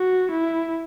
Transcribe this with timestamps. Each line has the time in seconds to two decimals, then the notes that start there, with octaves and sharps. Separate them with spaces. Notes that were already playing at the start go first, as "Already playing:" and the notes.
Already playing: F#4
0.32 E4